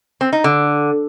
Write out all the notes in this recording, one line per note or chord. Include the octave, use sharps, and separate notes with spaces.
C4
D#4
D3